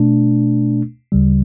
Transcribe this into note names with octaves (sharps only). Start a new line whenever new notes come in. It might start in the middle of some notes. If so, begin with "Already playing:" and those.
Already playing: B2 A3 D4
D2 C#3 G3